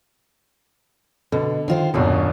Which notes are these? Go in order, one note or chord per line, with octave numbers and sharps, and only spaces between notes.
B2 D3
D#3 F4 C5
D#1 B1 F#2 B2 D4 F4